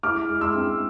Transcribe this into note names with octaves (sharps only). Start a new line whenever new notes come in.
E4 D6 F6
G#3
C6 E6
C4